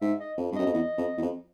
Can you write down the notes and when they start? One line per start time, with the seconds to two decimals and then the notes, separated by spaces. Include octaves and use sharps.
0.01 G#2 E5
0.20 D#5
0.38 F2
0.52 G2
0.56 F#2 D#5
0.66 F2
0.73 E2 D#5
0.98 F2
1.17 E2
1.22 F2